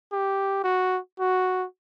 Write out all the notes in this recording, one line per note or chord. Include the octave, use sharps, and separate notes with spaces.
G4
F#4
F#4